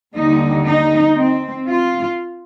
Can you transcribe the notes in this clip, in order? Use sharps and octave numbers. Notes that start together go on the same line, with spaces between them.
D#2 D3 G3 D#4
D#4
C4
F4